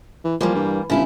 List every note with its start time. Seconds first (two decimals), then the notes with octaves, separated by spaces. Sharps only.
0.24 E3
0.41 E3 F3 G3 A#3
0.55 G2
0.90 G1 C#3 E4 F4